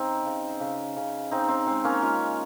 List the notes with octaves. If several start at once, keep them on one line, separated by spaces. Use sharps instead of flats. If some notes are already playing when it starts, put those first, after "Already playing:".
Already playing: C#3 C4 D#4
C#3
C#3
C#3
C#3 C4 D#4
C4 D#4
G#3 C4
A#3 C#4
G#3 C#4 F4